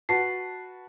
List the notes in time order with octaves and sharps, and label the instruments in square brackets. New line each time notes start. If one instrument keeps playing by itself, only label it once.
[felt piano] F#4 B4 A5 [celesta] C7